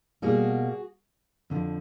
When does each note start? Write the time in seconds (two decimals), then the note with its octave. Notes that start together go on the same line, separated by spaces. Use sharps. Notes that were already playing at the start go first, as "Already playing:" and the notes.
0.22 B2 G3 A#3 F#4 G#4
1.50 F2 D3 F3